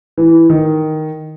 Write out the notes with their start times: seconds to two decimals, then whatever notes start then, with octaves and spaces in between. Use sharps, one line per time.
0.18 E3
0.50 D#3